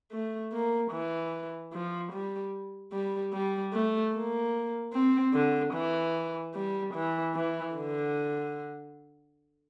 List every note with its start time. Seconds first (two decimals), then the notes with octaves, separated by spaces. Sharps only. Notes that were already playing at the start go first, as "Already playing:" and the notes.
0.11 A3
0.52 A#3
0.91 E3
1.72 F3
2.12 G3
2.93 G3
3.33 G3
3.73 A3
4.13 A#3
4.93 C4
5.34 D3
5.74 E3
6.54 G3
6.94 E3
7.35 E3
7.76 D3